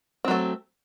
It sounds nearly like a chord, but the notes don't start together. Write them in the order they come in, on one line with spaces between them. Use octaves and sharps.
C4 F#3 A3